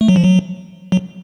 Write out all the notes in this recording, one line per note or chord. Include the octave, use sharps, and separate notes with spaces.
A3
F#3
F3
F#3
F#3